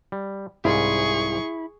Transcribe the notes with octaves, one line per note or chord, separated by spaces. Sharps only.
G3
C2 G#2 E4 F4 G#4 C#6